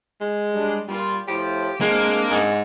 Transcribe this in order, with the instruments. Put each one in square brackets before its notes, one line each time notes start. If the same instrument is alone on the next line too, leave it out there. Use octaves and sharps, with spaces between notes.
[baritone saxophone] G#3
[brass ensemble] G3 D4
[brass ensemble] A#2 F4 [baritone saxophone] G3
[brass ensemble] A2 F3 [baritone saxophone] G4
[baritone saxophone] G#3 [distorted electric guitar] A#3 [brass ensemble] C4 D4
[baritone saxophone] G#2